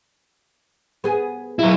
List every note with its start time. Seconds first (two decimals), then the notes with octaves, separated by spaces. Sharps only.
1.04 B3 G#4
1.59 F#3 E4